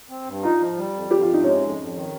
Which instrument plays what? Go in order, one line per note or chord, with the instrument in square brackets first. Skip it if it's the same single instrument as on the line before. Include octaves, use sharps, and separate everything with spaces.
[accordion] C4
G2
[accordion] D#4 [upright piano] F4
[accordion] F3
G3
F2
[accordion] F2 [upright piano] G4
[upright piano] F4
[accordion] C3
[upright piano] D#4
[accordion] G#3 [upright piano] C#4
[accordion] F2
F2
D#3